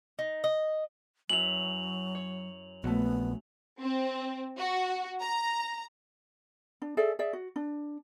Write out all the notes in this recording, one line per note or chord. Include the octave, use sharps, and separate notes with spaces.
D#4
D#5
F#2 F#3 E4 B4 F7 F#7
C#5
A#1 A3 B3 C#4 F#4
C4
F#4
A#5
D4
G#4 A4 D5 E5
G#4 D5 E5
F#4
D4